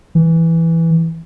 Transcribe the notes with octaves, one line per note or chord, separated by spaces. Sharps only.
E3